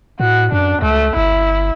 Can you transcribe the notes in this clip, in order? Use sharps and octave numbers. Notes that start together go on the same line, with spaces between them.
A2 F#4
F#2 D4
C#2 A3
G1 E4